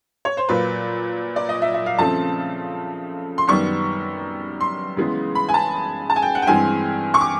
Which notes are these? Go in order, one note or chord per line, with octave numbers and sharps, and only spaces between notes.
C#5
C5
A#2 F#3 A#3 B4
D5
D#5
E5
E5
F5
C#3 F3 A3 C4 A5
C6
F#2 D#3 G3 B3 C#6
C6
C#3 E3 G#3 B3
B5
G#5
A5
A5
G#5
G5
F#5
G5
G2 E3 G#3 C4 G#5
C#6
D6